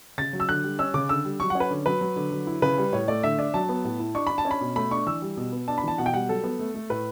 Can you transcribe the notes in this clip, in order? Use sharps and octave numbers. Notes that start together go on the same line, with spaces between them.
C#3 A6
F#3
E6
D3 F#6
G3
C#4 E6
C#3 D6
D3 E6
G3
F#3 C#6
C#4 F#5
B4
D3
F#3 B4
F#3
D3
F#3
E4
C#3 B4
G3
A2 C#5
A3 D5
D3 E5
D4
F#3 A5
B3
A2
E4
D4 C#6
D4 B5
A5
C#4
B5
B2
A3 B5
D4 C#6
E3 E6
G3
B2
B3
D4 A5
B5
E3 A5
B2 F#5
G5
G3 F#5
F#3 A4
B3
A3
A3
A2 B4